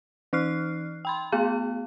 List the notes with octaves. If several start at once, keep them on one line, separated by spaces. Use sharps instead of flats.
E3 D#4 F6 F#6 C7
G5 B5 C6
A3 B3 G#4 F5